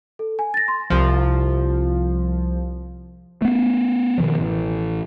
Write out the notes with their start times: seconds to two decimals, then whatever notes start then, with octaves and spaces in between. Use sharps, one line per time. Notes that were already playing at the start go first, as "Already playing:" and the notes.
0.19 A4
0.39 G#5
0.54 A6 A#6
0.68 C6
0.90 C2 F3
3.42 A3 B3
4.18 B2 D#3 F3
4.39 A1